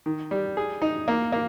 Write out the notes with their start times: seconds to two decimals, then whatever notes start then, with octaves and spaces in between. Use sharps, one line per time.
0.06 D#3
0.31 G3
0.57 G#4
0.82 D#4
1.08 A#3
1.32 A#3